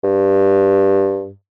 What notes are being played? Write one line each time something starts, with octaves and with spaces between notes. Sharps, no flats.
G2